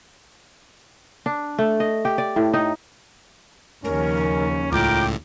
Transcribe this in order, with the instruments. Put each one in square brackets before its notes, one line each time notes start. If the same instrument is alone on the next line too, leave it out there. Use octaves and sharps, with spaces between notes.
[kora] D4
A3
D#5
G4
D5
A2
D#4
[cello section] D#2 C#3 F3 [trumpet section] C#4 [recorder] A#4
[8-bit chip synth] C#2 A2 [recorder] F4 [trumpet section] A#4 G5 D6